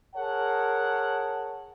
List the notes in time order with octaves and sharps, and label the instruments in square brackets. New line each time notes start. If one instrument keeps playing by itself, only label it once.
[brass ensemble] G#4 A#4 C#5 F#5 A5